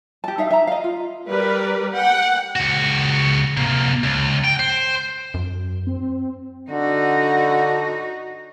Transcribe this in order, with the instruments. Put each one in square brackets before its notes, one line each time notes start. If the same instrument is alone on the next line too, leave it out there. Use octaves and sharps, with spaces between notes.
[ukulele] G4 A5
D#4 E5 F5
E5 A#5
D#5 F5
F4
[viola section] G3 A#4 B4 D5
F#5 G5
[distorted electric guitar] C#2 F#4
C3 A#3
C#2
G5
C5
[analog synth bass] F#2
[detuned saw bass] C4
[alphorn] D3 [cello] D#4 F#4